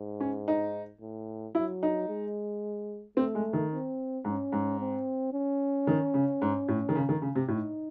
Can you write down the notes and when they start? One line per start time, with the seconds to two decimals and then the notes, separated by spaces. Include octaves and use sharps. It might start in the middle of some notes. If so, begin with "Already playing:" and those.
Already playing: G#2
0.20 C#4
0.48 D#4
1.01 A2
1.55 F#3 E4
1.83 D#4
2.09 G#3
3.17 A3 C4
3.35 G#3
3.53 D#3
3.72 C4
4.25 G#2 C#4
4.52 G#2
4.79 C4
5.33 C#4
5.87 D#3
6.14 C#3
6.42 G#2
6.68 A2
6.89 D#3
6.95 C#3
7.09 D#3
7.22 C#3
7.35 C3
7.48 A2 D#4